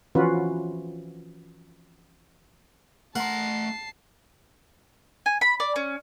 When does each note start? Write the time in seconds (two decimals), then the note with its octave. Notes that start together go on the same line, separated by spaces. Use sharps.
0.15 E3 F3 C#4 F4 F#4 B4
3.16 A3 A#4 F#5 A5 C6 C7
5.26 G#5
5.41 B5
5.60 D5
5.76 C#4